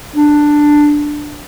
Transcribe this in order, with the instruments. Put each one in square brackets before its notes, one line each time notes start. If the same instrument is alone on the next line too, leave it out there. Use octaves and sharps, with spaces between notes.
[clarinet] D4